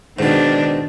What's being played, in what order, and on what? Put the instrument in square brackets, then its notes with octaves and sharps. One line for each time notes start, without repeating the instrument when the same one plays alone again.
[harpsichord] G#2 B2 [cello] D#3 D4